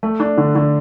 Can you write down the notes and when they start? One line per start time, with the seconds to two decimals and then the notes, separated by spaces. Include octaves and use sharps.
0.03 A3
0.20 D4
0.38 D3
0.55 D3